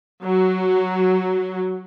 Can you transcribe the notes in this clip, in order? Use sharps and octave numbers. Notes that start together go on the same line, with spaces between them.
F#3